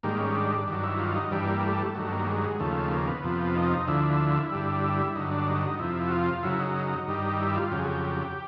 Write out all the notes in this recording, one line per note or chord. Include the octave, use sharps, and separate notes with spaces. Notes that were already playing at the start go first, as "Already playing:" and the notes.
G#2 D#3 G3 A#3
C#4
D4
G2 D#3 F#3 D4
E4
F4
D#4
G2 E3 G3 D4
A#3
A3
G2 D#3 F#3 A3
A#3
G#3
D#2 C#3 F3 A3
A#3
B3
F2 C3 F3
D#4
D2 D3 F3 E4
G2 D3 G3
E4
G2 D3 F#3 D#4
D4
D#4
F2 C3 F3 E4
F#4
F4
F#2 C#3 F#3 E4
D#4
G2 D#3 G3
E4
F4
F2 C#3 F#3 G4
G#4
G4